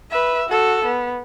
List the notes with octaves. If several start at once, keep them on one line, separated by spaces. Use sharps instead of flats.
B4 E5
F#4 A4
B3